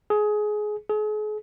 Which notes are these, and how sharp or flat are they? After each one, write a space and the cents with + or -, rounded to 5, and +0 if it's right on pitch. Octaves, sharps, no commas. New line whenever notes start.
G#4 +20
G#4 +40